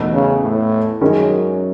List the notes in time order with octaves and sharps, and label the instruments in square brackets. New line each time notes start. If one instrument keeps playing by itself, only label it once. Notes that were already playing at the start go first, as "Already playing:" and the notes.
Already playing: [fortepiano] E2 B2 A3 D#4
[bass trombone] C#3
A2
[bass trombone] F#2 [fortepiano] D#3 G#3 C#4